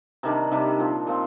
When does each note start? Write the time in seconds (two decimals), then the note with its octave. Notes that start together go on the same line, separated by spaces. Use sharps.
0.23 C3 D#3 G3 D4
0.51 C3 D#3 G3 D4
0.79 A#2 F3 C4
1.07 A#2 F3 C4